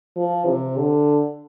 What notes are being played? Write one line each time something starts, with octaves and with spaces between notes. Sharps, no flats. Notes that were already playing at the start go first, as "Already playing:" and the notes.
F3
C3
D3